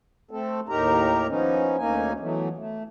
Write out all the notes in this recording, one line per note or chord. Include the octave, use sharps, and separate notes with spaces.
A3 C4 A4
D#2 A2 D#4 G4 A#4 A#5
F3 B3 C#4 D#4
D2 A#3 C#4 D#4 G#5
E3 F#3 A3 B3
A3